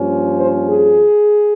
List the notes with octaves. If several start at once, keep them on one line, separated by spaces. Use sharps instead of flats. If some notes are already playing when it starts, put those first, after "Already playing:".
Already playing: G2 F3 A#3 C#4
C5
G#4